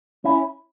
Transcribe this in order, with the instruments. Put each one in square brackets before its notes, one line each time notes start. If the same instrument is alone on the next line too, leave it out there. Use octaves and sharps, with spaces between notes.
[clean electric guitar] C#4 E4